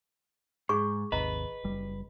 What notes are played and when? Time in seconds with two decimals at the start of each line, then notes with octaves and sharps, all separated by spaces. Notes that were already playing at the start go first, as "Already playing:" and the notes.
0.69 G#2 G#4 C#6
1.12 G#1 D#2 C3 B4 D#5 A#5
1.64 F#1 G3